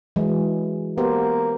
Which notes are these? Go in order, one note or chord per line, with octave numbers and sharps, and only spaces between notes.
E3 F#3 G#3
A#3 B3 G4 C5